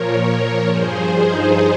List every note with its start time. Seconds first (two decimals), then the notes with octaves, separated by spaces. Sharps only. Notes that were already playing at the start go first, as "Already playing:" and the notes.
Already playing: A#2 F3 A#4 C#5
0.23 A#4 C#5
0.67 G2 F3 G#4 C5
1.14 D#4